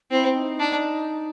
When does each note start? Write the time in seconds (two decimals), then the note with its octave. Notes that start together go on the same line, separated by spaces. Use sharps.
0.11 C4 E4
0.35 D#4
0.59 D4